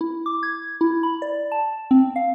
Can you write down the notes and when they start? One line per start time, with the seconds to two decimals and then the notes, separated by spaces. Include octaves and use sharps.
0.01 E4
0.26 D6
0.43 G#6
0.81 E4
1.03 B5
1.22 D5
1.52 A5
1.91 C4
2.16 F5